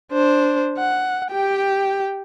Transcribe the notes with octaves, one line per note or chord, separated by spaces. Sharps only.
D4 C5
F#5
G4 G5